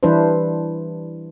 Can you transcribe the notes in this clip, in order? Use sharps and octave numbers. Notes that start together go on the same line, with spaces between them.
E3 G3 D4 E4 B4 C5